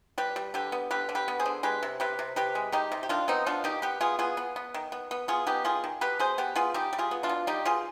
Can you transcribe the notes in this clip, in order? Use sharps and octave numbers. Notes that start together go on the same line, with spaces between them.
G3 G4 B4
G3
D3 G4 B4
B3
D3 G4 B4
D3
G4 B4
B3
G#4 C5
D3
G#3 G4 B4
C3
C3 G4 B4
C3
C3 G4 B4
G#3
D#3 D#4 G4
C3
G4
D#3 D4 F4
B3 C4 D#4
B3 D4 F4
D#3 D#4 G4
B3 G4 B4
B3 F4 G#4
B3 F4 G#4
B3
B3
D#3
B3
B3
B3 F4 G#4
B3 D#4 G4
D#3 F4 G#4
D#3
B2 G4 B4
B2 G#4 C5
B3 G4 B4
B3 F4 G#4
G3 D#4 G4
G3
F4 G#4
B3
D4 F4
B2
G3 D#4 G4
B2 F4 G#4